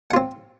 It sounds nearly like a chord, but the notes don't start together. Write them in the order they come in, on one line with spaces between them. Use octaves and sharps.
F#5 F4 C4